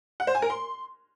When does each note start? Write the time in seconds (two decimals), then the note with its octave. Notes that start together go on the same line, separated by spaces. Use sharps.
0.20 F#5
0.27 C5
0.35 G#5
0.42 A#4
0.50 C6